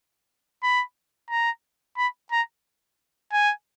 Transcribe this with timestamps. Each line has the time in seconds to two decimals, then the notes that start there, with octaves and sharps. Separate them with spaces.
0.63 B5
1.30 A#5
1.97 B5
2.31 A#5
3.32 G#5